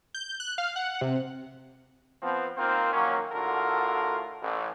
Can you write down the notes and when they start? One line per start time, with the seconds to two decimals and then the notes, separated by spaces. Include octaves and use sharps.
0.14 G6
0.40 F#6
0.58 F5
0.76 F#5
1.01 C3
2.22 F3 B3 C4
2.57 A#3 C4 D#4 F4 A#4 C5
2.93 A#2 D#3 F3 F#3 A#3 C#4
3.32 A2 D3 F4 F#4 A4 A#4
4.42 A1